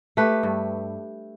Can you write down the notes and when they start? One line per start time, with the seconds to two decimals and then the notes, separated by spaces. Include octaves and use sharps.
0.17 A3 G4 B4
0.43 G2